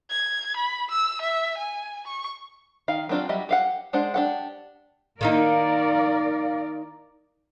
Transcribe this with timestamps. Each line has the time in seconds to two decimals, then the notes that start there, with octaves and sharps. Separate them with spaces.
0.10 G#6
0.56 B5
0.91 E6
1.22 E5
1.58 G#5
2.07 C#6
2.88 D#3 F5
3.09 F#3 C4 D4 F4 G4
3.29 F#3 G3 D#5 E5
3.49 G4 F5 F#5
3.93 G#3 D4 C5 F#5
4.14 D4 G4 F#5
5.21 D#3 A#3 D#4 A#4 D5 F5